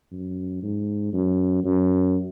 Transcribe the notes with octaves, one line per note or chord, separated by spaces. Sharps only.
F#2
G#2
F#2
F#2